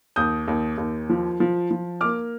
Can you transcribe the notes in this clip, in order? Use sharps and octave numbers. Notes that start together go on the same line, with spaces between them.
D#2 D#6 G6
D#2
D#2
F3
F3
F3
A#3 D6 F6